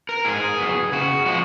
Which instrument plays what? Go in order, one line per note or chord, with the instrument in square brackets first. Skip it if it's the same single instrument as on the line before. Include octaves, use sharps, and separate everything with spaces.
[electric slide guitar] A#4
G#2 G#4
F#3 B3
C#3 F#4
F3 G#3 F#4